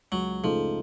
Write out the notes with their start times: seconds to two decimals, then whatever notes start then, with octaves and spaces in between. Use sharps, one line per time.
0.12 C#2 F#3
0.43 C#3 F3 A3 D#4 A4